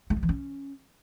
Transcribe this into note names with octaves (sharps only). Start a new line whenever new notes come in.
A3
G3
E3
C#4